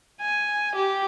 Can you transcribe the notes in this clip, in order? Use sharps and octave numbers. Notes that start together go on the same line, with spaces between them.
G#5
G4